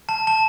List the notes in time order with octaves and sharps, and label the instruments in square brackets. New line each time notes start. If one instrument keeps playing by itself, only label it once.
[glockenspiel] A5
A5